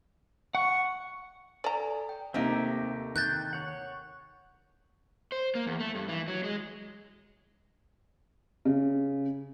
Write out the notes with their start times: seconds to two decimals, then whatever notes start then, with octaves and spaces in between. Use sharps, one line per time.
0.55 F#5 C#6
1.64 A4 D5 G#5 A#5
2.09 G5
2.34 D#2 C3 A3 A#3 C4 D#4 G4
3.16 D#3 G5 F#6 G6 A6
3.53 C#5 F#5
5.32 C5
5.55 A#3
5.67 E2
5.80 A3
5.95 G2
6.09 E3
6.28 F#3
6.44 G#3
8.65 C#3